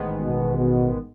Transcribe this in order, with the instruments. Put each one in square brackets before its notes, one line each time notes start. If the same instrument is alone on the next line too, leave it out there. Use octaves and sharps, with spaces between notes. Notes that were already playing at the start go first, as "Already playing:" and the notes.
Already playing: [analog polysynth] A1 G#2 D#3 G#3 B3
[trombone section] B2
B2